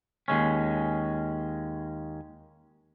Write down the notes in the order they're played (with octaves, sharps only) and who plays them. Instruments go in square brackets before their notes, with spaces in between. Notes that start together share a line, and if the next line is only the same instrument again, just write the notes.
[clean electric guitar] D#2 G#3 C#4